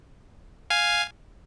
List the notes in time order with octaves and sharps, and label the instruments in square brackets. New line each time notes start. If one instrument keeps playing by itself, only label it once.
[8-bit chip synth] F5 G#5